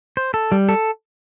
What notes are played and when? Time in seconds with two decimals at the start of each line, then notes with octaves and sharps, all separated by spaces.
0.17 C5
0.34 A4
0.52 G3
0.69 A4